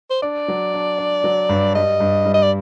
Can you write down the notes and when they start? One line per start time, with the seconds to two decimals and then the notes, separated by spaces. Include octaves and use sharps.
0.10 C5
0.22 D4 D5
0.48 F#3
0.74 D4
0.98 D4
1.24 F#3
1.49 G2
1.75 G3 D#5
2.00 G2
2.26 G3
2.34 D#5
2.43 D5